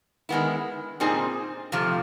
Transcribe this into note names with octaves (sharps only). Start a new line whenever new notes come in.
D#3 G#3 B3 E4
A#2 G3 C4 D#4 G#4
F2 C3 F3 A3